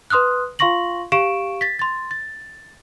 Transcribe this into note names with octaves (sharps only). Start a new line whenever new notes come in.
B4 C6 D#6 F6 F#6
F4 F5 C6 C#6 A#6 F#7
G4 F5 C#6 D7 E7
A6 B6
C6 A6
A6